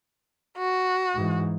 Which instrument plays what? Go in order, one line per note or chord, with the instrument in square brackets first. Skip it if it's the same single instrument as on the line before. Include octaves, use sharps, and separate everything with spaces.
[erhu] F#4
[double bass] G#2 E3